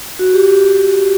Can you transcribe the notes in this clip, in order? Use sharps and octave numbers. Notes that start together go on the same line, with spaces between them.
F#4
G4